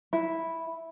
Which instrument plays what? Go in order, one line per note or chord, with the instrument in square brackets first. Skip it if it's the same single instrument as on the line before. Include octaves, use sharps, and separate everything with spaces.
[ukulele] E4